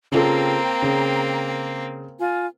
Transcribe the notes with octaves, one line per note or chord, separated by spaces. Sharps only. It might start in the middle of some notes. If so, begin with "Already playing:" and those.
C#3 A#3 C4 F4 A4 G5 A#5
C#3
F4 G#5